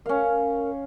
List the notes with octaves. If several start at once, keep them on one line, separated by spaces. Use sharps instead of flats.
C#4 A#4 F5